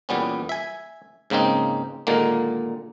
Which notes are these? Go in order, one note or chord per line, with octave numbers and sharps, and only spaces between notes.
E2 A#2 G3 B3 C#4
E5 G#5
G#2 C#3 A#3 C4 D#4
A#2 D3 D#3 G#3 A#3